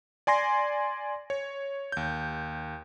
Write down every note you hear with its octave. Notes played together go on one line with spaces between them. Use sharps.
D5 G#5 C6 A#6
C#5
D#2 G6